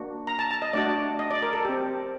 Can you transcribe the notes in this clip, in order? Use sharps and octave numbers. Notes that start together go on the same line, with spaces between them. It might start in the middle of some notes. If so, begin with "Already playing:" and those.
Already playing: A#3 D4 F#4
A#5
A5
A5
D#5
A3 D4 F#4 D5
D#5
D5
A#4
A4
C4 G4